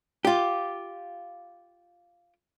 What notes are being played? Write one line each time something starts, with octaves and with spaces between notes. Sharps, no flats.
F4 G4